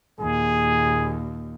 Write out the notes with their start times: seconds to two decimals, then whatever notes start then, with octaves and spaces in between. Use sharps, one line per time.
0.20 D#2 A#2 G#4